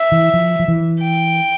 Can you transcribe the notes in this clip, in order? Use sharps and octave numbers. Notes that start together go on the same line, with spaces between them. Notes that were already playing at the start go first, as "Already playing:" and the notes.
Already playing: E5
E3
F3
F3
E3
G5